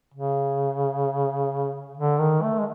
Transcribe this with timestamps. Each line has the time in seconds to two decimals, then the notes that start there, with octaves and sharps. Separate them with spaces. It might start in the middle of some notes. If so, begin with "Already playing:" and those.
0.14 C#3
1.97 D3
2.19 D#3
2.42 A3
2.59 G#3